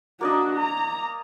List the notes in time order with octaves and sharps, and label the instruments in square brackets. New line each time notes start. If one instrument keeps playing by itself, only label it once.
[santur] A#3 D5 D#5 [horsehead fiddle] D4 F#4
[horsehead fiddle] A#5